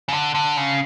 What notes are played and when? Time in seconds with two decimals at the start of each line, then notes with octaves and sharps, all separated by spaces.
0.08 C#3
0.13 D3
0.35 D3
0.57 C#3